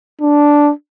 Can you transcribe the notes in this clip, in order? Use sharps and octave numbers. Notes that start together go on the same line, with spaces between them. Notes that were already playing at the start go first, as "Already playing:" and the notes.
D4